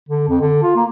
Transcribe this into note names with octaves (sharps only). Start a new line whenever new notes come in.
D3
F2
D3
F4
A#3